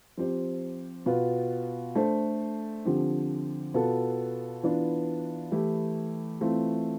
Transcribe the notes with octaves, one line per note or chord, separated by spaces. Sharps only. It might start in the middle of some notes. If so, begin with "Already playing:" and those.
F3 C4 G4 C5
B2 B3 F4 B4
A3 D4 A4 C5
D3 F3 C4 G4
B2 B3 F4 A4
E3 B3 D4 F4
E3 A3 E4 G4
E3 A3 C4 F4